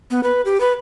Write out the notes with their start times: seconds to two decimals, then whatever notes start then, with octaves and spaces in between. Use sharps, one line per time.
0.11 B3
0.23 B4
0.45 G4
0.61 B4